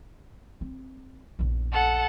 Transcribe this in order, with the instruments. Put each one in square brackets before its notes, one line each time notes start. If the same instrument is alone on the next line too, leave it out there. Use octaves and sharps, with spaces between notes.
[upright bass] C4
A#1 E2
[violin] A4 F#5